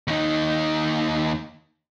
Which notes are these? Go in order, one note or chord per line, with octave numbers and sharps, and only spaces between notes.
D#2 D#4